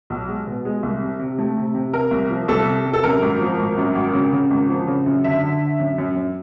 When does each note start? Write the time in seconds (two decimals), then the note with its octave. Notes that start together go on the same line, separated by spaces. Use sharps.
0.10 B1
0.28 G#3
0.47 B2
0.65 G#3
0.83 C2
1.02 C3
1.19 C3
1.39 A3
1.57 C3
1.75 C3
1.93 C3 A#4
2.11 C2
2.30 F3
2.48 C2 A4
2.67 C3
2.86 C3
2.93 A4
3.03 F#2 A#4
3.22 G#1
3.41 F3
3.59 G#1
3.77 F#2
3.95 G#1
4.13 C#3
4.32 C#3
4.51 G#1
4.70 F3
4.87 C#3
5.06 F#2
5.24 D3 E5
5.43 D3
5.62 D3
5.80 F#2
5.98 F#2
6.15 F#2